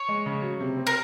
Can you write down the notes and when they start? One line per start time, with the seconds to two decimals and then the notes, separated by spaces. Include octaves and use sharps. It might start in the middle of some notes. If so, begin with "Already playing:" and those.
Already playing: C#5
0.09 G#3
0.26 C#3
0.42 F#3
0.60 C3
0.77 C4
0.87 A#4